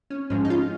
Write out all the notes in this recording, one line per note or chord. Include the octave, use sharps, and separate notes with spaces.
C#4
G#2 F3 G#3 C#4
D#4
C#4 F4